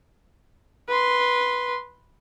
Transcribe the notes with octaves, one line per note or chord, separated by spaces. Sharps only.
B4 C6